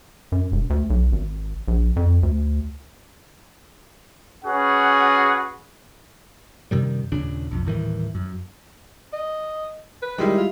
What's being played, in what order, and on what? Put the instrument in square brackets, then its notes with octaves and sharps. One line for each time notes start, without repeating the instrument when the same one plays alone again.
[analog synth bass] F#2
E1
D2
B1
G#1
A#1
F2
D2
[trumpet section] C#4 F#4 G#4 B4 F#5
[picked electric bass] F#2 C3 D#3 G3
D#2 A#2 C#3 D4
B1 F2
D#1 A2 D#3 E3
F#2
[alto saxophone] D#5
B4
[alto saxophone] D#3 [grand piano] G3 G#3 E4
[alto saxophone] F4